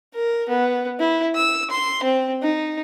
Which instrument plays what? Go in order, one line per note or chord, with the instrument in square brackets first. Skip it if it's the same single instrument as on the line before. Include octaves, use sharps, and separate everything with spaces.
[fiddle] A#4
B3
E4
E6
C6
C4
D#4